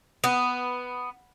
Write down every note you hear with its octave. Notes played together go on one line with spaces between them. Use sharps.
B3